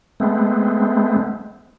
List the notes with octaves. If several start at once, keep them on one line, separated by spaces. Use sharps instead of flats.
G#3 A3 B3 C4